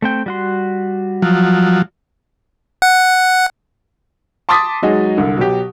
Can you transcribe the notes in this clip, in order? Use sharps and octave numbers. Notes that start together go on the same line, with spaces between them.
A3 C4 G5
G3 F#4 C6
F3 F#3
F#5
A5 C6 D6 D#6 A6 B6
F#3 G#3 D#4 F#4 G#4
C2 D3
B2 F#3 G4